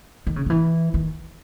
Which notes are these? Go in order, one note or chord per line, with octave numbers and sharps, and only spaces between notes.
D#3
C#3
D#3
E3
D#3